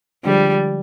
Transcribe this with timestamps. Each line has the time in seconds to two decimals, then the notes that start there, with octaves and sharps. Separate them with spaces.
0.24 D3 F3 G3 G#3